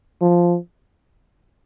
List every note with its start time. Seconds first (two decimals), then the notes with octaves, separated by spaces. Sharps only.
0.21 F3